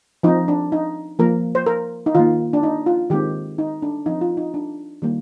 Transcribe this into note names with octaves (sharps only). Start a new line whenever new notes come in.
F3 C4 D#4
D4
D#4
F3 A#3 A#4
C5
A#4
D#4
D#3 A#3 F4
D4
D#4
F4
D#3 G#3 C4 G4
D#4
D4
F3 C4 D#4
F4
D#4
D4
D#3 G3 A#3